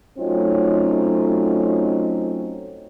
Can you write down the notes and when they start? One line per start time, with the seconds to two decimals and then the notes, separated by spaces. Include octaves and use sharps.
0.18 F#3 A3 C4 C#4 D#4 F4